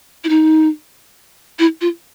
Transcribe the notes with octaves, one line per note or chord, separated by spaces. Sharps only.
E4
D#4
E4
F4